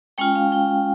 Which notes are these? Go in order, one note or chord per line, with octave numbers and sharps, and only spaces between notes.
G#3 C#4 F4 G5
F5
G5